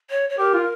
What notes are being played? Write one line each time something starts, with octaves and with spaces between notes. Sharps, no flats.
C#5
C#5
G4 A#4
F4